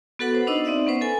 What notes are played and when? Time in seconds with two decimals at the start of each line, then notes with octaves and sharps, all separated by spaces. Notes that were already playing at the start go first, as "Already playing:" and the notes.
0.19 B3 F#4 A4 B4 F#5 B5
0.35 C5
0.47 D4 D#4 C5 D#5 E6
0.65 C4 D#4 D5 E5 F#5
0.87 B3 C#4 B4 C5
1.01 A4 G#5